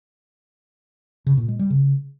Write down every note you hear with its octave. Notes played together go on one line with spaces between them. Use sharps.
C#3
A#2
G#3
G3
C#3